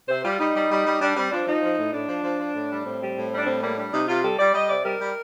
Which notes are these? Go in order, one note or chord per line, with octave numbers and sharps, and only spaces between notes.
C3 C5
G3 F4
G3 D#4
G3
G3
G3
G3 D4
G3 C4
F3 D4
F3 D#4
F3
A2
A2 D4
F3
F3
F3
A2
G3
A2 C4
G3
A2
G3
D4
A2 C4
G3 A#3
G3 D4
C3 D#4
C3 F4
G3 A4
G3 D5
G3 D#5
C3 D5
G3 A#4
G3